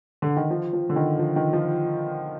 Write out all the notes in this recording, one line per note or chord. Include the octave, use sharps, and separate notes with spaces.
D3
D#3
F3
F3
D3
D#3
F3
D#3
F3